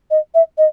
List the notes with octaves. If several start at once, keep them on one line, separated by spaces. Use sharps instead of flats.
D#5
E5
D#5